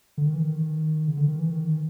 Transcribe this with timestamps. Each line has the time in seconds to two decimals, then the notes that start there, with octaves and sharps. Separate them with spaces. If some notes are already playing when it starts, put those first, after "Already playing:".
0.18 D3
0.26 D#3
0.34 E3
0.42 D#3
1.08 C#3
1.17 D3
1.28 D#3
1.39 E3
1.50 D#3